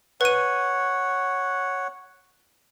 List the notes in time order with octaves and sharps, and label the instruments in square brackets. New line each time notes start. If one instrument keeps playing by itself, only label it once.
[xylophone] B4 D#7 [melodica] C#5 F#5